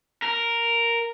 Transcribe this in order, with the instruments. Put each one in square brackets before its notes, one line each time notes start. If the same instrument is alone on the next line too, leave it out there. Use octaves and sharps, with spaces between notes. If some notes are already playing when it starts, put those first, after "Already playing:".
[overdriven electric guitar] A#4